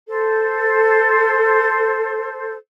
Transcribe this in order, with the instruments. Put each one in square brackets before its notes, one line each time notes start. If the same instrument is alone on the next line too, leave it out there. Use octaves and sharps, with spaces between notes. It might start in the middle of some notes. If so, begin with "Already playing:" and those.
[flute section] A4 C5